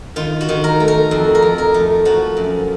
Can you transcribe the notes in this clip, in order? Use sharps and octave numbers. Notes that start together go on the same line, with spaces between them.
D#3 F4
F#4
D#3
A#4
A3
A#4
F2
A#4
F2
A#4
A3
F3 F#4
F#2